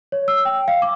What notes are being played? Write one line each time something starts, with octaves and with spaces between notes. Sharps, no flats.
C#5
E6
G5
F5
D6